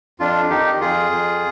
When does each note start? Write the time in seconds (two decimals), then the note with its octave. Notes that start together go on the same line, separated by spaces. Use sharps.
0.20 F2 D4 F4
0.50 D#3 D#4 G4
0.81 F2 F4 G#4
1.11 F2